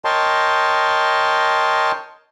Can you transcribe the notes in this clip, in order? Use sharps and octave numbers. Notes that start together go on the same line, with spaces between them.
A#4 C#5 D#5 G5 A5 C6